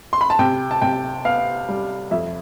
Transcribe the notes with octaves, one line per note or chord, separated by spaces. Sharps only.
C6
B5
A5
C3 G5
A5
C3 G5
B3 F5
G3
F2 E5